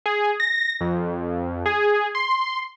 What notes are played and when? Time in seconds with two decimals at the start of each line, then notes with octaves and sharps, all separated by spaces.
0.06 G#4
0.40 A#6
0.81 F2
1.66 G#4
2.15 C6